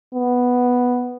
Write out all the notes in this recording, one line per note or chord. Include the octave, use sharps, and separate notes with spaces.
B3